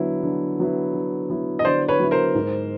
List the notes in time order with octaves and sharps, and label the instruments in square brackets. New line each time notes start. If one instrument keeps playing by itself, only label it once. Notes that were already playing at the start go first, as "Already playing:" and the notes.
Already playing: [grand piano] D3 F#3 B3 E4
D3
F#3 B3 E4
D3
F#3 B3 E4
[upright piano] D#5
[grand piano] D3 [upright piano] C5 D5
[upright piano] B4 C#5
[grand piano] F#3 B3 E4
[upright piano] A#4 C5
[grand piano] G#2